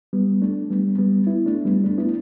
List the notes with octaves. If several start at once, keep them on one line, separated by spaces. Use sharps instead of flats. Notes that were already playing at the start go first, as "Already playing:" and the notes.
G3 B3
A3 D4
G3 B3
G3 B3
B3 E4
A3 D4
G3 B3
A3 D4
B3 E4